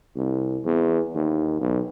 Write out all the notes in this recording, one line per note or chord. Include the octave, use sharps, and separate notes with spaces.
C2
E2
D#2
B1